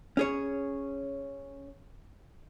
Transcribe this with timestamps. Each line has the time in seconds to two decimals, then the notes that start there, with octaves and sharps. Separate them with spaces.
0.17 C#4 G#4 C#5